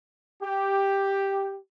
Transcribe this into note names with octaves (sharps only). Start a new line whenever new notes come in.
G4